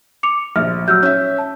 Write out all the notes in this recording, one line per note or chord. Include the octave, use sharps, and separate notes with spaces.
D6 C#7 F7
A#1 E5 F6
F#3 E6 F6 G6
C#4 E5
A5